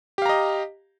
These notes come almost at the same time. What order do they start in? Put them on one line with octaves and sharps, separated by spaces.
G4 F5 A#5 D#5